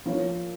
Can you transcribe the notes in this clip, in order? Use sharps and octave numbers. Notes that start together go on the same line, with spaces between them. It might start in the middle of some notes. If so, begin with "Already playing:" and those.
F3 A#3 F4 A#4 C#5